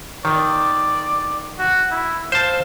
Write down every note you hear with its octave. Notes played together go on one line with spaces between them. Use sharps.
D#3 D5
F#4
E4
C5 F5 A5